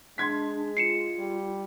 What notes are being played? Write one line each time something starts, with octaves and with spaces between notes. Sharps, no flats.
G#3 D4 C6 G#6 B6
F4 C7 C#7 E7
G3